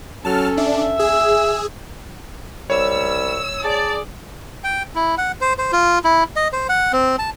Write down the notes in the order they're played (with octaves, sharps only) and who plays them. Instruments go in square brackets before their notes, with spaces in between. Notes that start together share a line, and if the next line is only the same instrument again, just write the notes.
[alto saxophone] F#3 [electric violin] C#4 A4 [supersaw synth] A5 F6
[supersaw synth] D4 [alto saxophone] E5
[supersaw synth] G#4 [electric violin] E6
[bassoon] C2 [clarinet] G3 [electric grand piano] C#5 [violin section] E6
[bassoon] G#4 [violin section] D5 [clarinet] A5
[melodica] G5
E4
F#5
C5
C5
F4
E4
D#5
C5
F#5
C4
A5